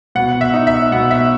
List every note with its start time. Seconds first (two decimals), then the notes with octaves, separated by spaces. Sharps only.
0.15 B2 F#5
0.41 E5
0.54 D#4
0.67 E5
0.92 B2 F#5
1.11 E5